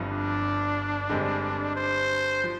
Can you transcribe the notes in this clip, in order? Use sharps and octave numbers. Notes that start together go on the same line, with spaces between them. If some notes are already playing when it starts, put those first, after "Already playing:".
Already playing: G1 G2 F3 C4
D4
G2 D3 G#3 C4 G4
C5
F3